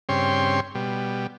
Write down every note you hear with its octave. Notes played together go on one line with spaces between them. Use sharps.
G2 C#3 C4 C#5 G5 C6
B2 G3